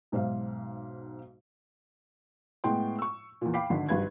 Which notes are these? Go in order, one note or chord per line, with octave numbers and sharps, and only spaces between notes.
B1 G#2 C5 E5 F5
A2 G#3 B3 G5 C6
C#6 E6
E2 A#2
F5 G5 B5 D6 B6 C7
G#1 D3
G#1 G2 B4 G#6